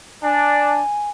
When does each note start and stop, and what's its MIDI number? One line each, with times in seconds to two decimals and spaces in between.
0.23 0.79 62
0.23 1.10 80